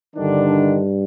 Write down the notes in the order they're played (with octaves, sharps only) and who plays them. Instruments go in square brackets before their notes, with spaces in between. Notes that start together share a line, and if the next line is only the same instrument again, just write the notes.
[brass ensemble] G2 D3 D#3 D4